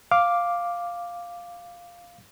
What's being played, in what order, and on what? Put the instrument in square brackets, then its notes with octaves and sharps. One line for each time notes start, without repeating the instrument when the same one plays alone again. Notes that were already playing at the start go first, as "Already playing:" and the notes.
[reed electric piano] F5 D6